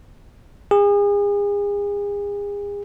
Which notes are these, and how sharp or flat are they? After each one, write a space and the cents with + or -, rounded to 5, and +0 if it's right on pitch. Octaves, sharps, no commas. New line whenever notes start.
G#4 -35